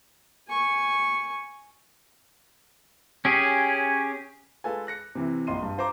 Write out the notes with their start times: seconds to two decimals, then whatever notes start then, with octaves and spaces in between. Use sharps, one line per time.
0.48 G#5 C#6
3.25 C#4 G4 G#4
4.64 G#3 F4 A4 B4 G#5
4.87 F#6 A#6 C#7
5.15 C3 E3 E4
5.47 A#1 A#3 D#5 C6 D#7
5.63 G2
5.78 F4 C5 A#5 D6